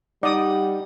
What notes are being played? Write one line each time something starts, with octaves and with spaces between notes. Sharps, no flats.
G3 D#4 D5 F#5 D#6